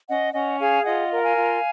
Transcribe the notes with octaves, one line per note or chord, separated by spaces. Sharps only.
C#4 D#5 F#5
C#4 D#5 F#5
G#4 F5 G#5
F4 D#5 F#5
A#4 F#5
F5 G#5
F4